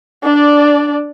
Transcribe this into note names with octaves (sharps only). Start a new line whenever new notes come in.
D4 D5